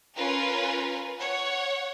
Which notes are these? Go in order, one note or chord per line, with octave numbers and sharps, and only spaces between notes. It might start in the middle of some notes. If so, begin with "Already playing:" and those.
C#4 F4 A#4 B4
C#5 F#5